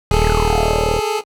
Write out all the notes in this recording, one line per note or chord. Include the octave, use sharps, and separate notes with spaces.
D#1 G#4 A4